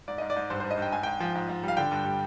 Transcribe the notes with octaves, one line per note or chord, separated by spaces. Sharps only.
G#2 D5
G#2 D#5
D5
G#2
G2 C5
G2 C5
D#5
G2 G5
G#2 G#5
G#2 G5
F3
G#2
G#2
G3
F5
D3 G5
G2
G3